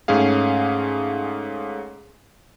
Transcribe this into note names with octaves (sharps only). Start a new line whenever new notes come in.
G#2 A3 C#4 G#4 F5